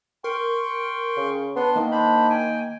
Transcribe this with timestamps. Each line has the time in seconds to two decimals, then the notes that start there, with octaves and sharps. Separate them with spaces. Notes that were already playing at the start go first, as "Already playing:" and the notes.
0.24 A#4 G5 C6 C#6
1.17 C#3
1.56 B3 D4 C6
1.76 D#3 A#3
1.92 D4 C5 B5
2.30 G5 G#5